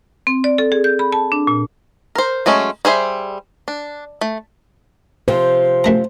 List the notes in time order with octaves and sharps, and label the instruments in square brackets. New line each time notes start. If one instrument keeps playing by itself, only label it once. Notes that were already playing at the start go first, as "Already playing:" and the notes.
[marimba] C4
D5
A4
G#4
G6
B5
A5
D4
A#2
[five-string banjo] A#4 C5
F#3 G#3 A3 C#4
G3 G#4 C5 E5
D4
A3
[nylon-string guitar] C3 F3 [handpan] C5
[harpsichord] F#2 A3 A#5